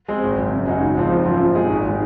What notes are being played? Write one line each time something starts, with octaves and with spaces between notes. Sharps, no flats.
G#3 C4
G#1
F#2 C#3
F#2
C#3 G#3 D#4 F#4
G#1
G#2 F3 C4 D#4
G#1
F#2 F3 C4 F4
A#2
G#3 D#4 G#4
G#1
D#3 G#3